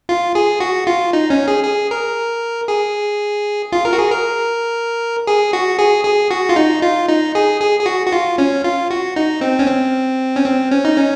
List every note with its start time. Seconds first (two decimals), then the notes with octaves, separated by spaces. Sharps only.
0.09 F4
0.35 G#4
0.60 F#4
0.87 F4
1.13 D#4
1.30 C#4
1.48 G#4
1.64 G#4
1.91 A#4
2.68 G#4
3.72 F4
3.85 A#4
3.93 F#4
3.98 G#4
4.11 A#4
5.27 G#4
5.53 F#4
5.79 G#4
6.04 G#4
6.31 F#4
6.49 F4
6.56 D#4
6.82 F4
7.08 D#4
7.35 G#4
7.61 G#4
7.79 G#4
7.86 F#4
8.06 F#4
8.12 F4
8.38 C#4
8.64 F4
8.90 F#4
9.16 D#4
9.41 C4
9.59 C#4
9.67 C4
10.36 C#4
10.46 C4
10.71 C#4
10.85 D#4
10.97 C#4